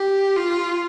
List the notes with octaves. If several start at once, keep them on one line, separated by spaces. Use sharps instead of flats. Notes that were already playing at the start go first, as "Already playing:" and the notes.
Already playing: G4
F4